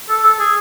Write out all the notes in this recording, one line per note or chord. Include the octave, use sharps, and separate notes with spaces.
A4
A4
G#4